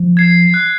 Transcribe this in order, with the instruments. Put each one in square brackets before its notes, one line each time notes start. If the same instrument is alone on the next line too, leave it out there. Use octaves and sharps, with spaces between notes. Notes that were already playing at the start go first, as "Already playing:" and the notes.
Already playing: [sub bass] F3
[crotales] G#6 C7
F#6